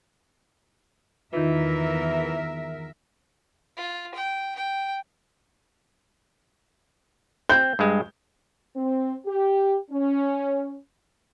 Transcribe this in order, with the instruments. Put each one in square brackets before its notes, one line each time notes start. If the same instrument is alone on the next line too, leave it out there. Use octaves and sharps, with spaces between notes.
[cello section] E2 A#4 E5 [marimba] D#3 D#4 F4 [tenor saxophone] E3
[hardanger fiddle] F4
G5
G5
[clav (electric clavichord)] C4 [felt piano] G6
[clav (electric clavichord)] G2 G#3
[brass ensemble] C4
G4
C#4